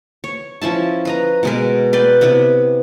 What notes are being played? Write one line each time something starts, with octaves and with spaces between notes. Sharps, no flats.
C#5
F3 C#4 E4 A5
B4 D#5 A#5
B2 G#3 A#4
B4 D5 G5
C3 B3 E4 B4